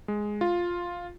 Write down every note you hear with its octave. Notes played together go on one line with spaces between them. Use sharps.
G#3
F4